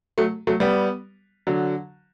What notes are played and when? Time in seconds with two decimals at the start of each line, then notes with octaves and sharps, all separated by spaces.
0.18 F#3 A3
0.47 F#3 A3
0.60 G3 B3
1.47 D3 F#3